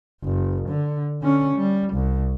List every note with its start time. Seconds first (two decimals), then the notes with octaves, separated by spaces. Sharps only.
0.23 F#1
0.69 D3
1.22 D3 C#4
1.57 G3
1.93 C2